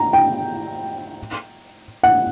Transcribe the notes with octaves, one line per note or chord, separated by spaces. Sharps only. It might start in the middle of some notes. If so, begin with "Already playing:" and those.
Already playing: A#5
G5
F#5